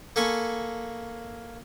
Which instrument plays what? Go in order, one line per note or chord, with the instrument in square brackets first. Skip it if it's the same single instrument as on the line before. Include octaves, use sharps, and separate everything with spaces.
[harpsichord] A#3 A4 G#5 B5 C#6